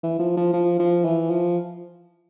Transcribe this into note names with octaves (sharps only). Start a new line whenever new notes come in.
E3
F3
F3
F3
F3
E3
F3